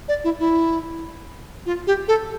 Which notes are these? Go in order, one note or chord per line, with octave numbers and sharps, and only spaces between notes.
D5
E4
E4
F4
G4
A4